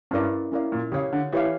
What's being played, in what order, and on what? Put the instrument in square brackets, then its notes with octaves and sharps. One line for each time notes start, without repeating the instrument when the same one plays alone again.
[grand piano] G2 [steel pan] C#4 E4 A#4 D5 F5
[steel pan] C#4 E4 A#4 D5 F5
[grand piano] A#2
[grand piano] C#3 [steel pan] G4 C#5 F5
[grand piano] D3
[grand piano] E3 [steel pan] G4 C#5 F5